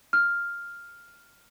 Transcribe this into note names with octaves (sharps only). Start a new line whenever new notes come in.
F6